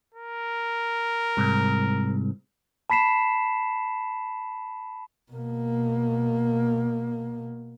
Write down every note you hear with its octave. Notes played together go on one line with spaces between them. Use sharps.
A#4
C2 G#2
A5 B5 B6 C7 E7
B2 A#3